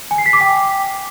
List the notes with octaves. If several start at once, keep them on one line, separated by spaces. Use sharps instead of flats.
G#5
C7
B6
D6
G5